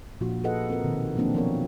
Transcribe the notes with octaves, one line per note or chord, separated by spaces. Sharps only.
A#2 F3 D4 F4 F#4
F4 G#4 A4 B4 D#5 F#5
C4 F#4 A#4
B2 D#3 C4
F3 F#3 A#3 C4 D4
F3 B3 C4 F4 A#4 C#5